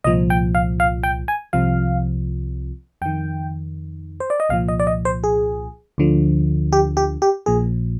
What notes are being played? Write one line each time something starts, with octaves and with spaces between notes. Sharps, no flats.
C2 A#2 F3 D#5
G5
F5
F5
G5
G#5
C2 C3 F3 F5
F2 D#3 G5
C5
D5
D#5
C2 A#2 F3 F5
D#5
D5
D#5
C5
G#4
D2 D3 F3
G4
G4
G4
A#1 A#2 F3 G#4